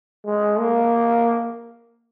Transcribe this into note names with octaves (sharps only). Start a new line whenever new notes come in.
G#3
A#3